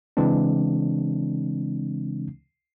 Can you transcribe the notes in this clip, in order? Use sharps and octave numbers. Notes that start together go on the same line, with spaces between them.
C#3 E3 G#3 C4 D4